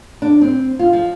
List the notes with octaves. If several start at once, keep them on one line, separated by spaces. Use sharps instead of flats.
D4
C4
F4
F3